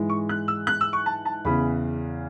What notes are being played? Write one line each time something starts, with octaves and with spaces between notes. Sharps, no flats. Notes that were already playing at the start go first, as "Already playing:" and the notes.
Already playing: G#2 E3 G#3
C#6
F#6
E6
F#6
E6
C#6
A5
A5
E2 C#3 E3 B5